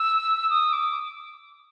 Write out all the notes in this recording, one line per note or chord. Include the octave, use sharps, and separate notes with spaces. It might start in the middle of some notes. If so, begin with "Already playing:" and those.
Already playing: E6
D#6
D6